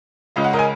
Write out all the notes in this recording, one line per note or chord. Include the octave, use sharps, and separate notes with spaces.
C#2 C#3 G#3 C#4 D#5
F#5
A#4 D#5
G#5